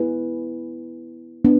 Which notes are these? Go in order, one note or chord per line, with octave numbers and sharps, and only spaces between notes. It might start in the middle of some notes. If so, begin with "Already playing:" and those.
Already playing: B3 E4 G#4 B4
B3 D4